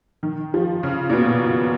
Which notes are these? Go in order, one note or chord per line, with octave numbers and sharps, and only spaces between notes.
D#3
F3
C#3
A#2
B2